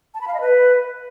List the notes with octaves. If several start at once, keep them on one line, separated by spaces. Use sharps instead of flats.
A5
B5
F5
D#5
B4